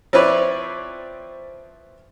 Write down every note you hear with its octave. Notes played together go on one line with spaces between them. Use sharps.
F3 C4 E4 B4 C#5 D5